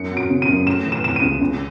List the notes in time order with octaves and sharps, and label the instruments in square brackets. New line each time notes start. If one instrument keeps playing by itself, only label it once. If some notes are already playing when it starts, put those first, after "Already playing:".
Already playing: [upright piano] F#2 C#7
F#3
D7
C#3
D#7
F#2
A3 E7
E3
E7
C3 E7
D#7
C#2
C#2